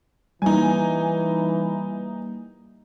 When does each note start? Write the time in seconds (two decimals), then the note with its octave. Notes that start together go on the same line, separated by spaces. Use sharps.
0.42 E3 G3 A#3 D#4 G#5